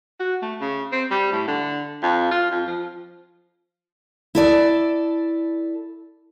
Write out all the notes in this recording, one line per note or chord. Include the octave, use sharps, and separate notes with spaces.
F#4
A3
C#3
C4
G3
A2
D3
F2
F4
F2
F3
E4 A4 D5